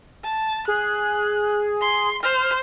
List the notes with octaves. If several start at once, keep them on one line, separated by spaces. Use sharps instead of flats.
A5
G#4 F#6
C6
C5 F6